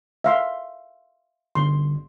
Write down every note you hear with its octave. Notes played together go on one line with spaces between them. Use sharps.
E5 F5 C6
G1 C6